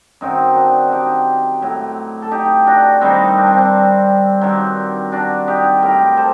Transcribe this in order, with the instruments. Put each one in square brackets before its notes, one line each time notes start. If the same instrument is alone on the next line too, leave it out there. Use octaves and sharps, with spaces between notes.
[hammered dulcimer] F#2 D#3 F#3 C4 D#4
D4 F#4
D#4 F#4 G4
A2 F#3
A4
D#4 G4
D4 F#4
G2 D#3 G3 C4 D#4
D4
C4
D4
G2 D#3 F#3
D4 F#4
D#4 G4
A2 F#3 G4 A#4
A4 C5